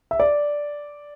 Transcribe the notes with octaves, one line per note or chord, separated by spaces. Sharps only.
E5
D5